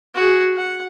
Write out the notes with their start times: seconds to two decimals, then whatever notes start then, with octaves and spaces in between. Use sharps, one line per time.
0.15 F#4 G#4
0.56 F#5